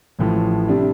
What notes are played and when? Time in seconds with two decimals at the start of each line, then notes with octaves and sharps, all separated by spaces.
0.19 A1 A2 F3
0.68 C3 G3 D4